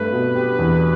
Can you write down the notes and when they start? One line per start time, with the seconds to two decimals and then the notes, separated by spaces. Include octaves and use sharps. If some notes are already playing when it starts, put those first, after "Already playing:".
Already playing: G2 A3 B4
0.12 B2
0.35 G4
0.59 E2